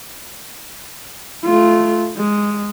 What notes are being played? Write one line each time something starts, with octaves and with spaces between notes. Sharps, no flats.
A3 F4
G#3